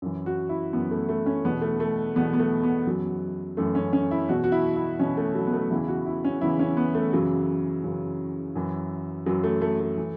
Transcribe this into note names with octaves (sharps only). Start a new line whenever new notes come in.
F#2 E3
F#4
E4
F#2 E3 B3
A3
A3
C#4
E2 B2 B3
A3
A3
E2 B2 B3
B3
A3
B3
F#2 E3 F#3
F#2 E3 A3
C#4
C#4
E4
E2 B2 F#4
F#4
E4
E4
E2 B2 C#4
A3
F#3
B3
A3
E2 C#3 E3 E4
F#4
E4
C#4
E2 C#3 E3 E4
C#4
B3
A3
F#2 C#3 E3 F#3
F#2 C#3 E3
F#2 E3
F#2 E3 F#3
A3
A3
A3
E3